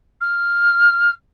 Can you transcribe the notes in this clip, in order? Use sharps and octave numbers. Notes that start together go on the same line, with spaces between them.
F6